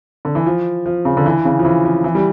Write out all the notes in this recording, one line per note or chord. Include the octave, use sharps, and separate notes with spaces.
D3
E3
F3
F3
C#3
D3
E3
C#3
F3
E3
F3
E3
G3